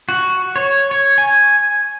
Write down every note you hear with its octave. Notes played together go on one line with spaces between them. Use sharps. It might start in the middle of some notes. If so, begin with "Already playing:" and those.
F#4
C#5
C#5
G#5